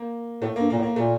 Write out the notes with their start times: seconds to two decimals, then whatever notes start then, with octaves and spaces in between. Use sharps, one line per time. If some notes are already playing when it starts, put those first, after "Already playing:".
Already playing: A#3
0.42 A2 A3
0.56 G2 A#3
0.70 A#2 A#3
0.78 A2
0.83 A#3
0.96 A#2 A3